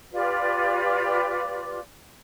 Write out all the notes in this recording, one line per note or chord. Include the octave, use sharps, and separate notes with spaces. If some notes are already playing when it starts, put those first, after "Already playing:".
F4 G4 B4 D5